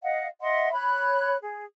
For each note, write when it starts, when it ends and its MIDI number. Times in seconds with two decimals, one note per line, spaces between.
0.03 0.27 75
0.03 0.27 77
0.03 0.27 78
0.41 0.72 75
0.41 0.72 76
0.41 0.72 78
0.41 0.72 84
0.73 1.36 73
0.73 1.36 83
0.73 1.36 90
1.42 1.64 68